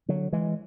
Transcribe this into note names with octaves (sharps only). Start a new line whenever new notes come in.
D3 F#3
E3 G#3